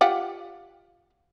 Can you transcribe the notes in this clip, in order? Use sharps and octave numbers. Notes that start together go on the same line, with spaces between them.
F4 G4 F#5